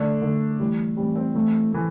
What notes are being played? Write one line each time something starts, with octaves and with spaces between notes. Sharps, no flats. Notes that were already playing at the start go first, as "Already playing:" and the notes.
Already playing: D3 A3 D4
D3 A3
A2 E3 G3
A2 E3 G3 C4
C4
A2 E3 A3
E3 A3